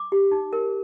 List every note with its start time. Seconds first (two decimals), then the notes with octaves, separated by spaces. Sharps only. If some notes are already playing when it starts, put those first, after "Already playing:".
Already playing: D6
0.12 G4
0.31 D#4
0.53 A#4